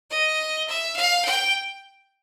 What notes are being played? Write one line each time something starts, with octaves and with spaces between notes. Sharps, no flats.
D#5
E5
F5
G5